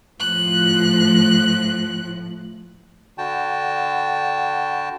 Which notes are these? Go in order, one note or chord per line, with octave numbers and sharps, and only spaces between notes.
A2 F3 F#6
D3 F#4 G5 A5